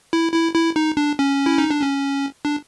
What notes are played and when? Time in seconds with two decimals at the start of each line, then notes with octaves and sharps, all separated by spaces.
0.13 E4
0.34 E4
0.55 E4
0.76 D#4
0.97 D4
1.19 C#4
1.46 E4
1.58 D#4
1.70 D4
1.82 C#4
2.45 D4